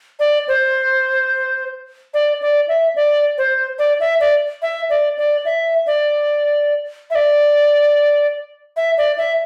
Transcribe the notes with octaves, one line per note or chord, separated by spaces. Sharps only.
D5
C5
D5
D5
E5
D5
C5
D5
E5
D5
E5
D5
D5
E5
D5
E5
D5
E5
D5
E5